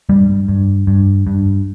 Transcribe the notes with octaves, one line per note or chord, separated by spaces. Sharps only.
G2 G3
G2
G2
G2